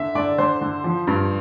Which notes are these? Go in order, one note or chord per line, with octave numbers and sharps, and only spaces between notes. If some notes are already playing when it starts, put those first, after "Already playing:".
Already playing: D3 E5
D3 D5
D3 C5
D3
F3
G2